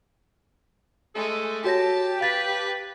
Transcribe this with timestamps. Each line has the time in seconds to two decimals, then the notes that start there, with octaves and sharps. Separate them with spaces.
1.16 G#3 A3 A4
1.64 F#4 G4 C#5 A5 A#6
2.21 B4 F5 A6 B6